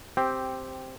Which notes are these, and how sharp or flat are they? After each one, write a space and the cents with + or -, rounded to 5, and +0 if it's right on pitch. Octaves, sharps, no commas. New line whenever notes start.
C4 +0 G4 -5